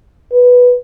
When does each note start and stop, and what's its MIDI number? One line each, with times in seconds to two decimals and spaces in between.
0.33 0.74 71